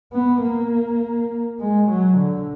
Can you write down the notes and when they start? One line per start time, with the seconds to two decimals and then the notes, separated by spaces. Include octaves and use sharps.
0.13 B3
0.43 A#3
1.60 G#3
1.90 F#3
2.19 D3